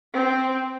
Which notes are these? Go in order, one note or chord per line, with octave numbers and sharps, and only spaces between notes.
C4